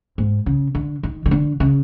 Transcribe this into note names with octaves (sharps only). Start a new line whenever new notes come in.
G#2
C#3
D3
D#3
D#3
D3
C#3